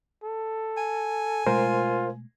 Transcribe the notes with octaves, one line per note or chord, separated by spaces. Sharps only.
A4
G#5
B2 G#3 A3 F4 A#4 C5